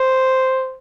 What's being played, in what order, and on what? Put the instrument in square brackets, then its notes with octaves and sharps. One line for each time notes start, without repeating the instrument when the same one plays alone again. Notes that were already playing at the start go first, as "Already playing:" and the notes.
Already playing: [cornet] C5